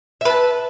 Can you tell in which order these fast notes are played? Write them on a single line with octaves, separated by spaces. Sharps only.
E5 B4 A5